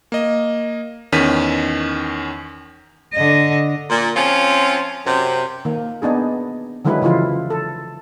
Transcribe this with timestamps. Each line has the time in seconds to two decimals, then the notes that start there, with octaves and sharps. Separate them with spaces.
0.12 A#3 D#5
1.12 E2 D#3 C#4 B6 D#7
3.14 D3 D#5
3.90 A#2
4.16 F3 C4 C#4 F4
5.06 F#2 C3
5.65 D#3 A#3
6.02 B3 D4 D#4 G#4
6.85 D3 D#3 F#3 G#3 E4 B4
7.02 C#3 E3 F3 E4 F4
7.50 A4